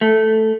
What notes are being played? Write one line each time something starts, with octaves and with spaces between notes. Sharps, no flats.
A3